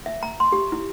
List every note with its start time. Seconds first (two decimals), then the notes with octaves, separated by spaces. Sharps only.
0.06 E5
0.23 A#5
0.40 C6
0.52 G4
0.72 E4